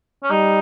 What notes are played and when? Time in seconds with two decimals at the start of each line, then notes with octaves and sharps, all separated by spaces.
0.23 C#4
0.31 G3 D#4